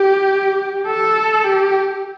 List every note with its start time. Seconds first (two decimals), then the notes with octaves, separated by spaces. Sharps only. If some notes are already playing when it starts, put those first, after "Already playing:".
Already playing: G4
0.86 A4
1.44 G4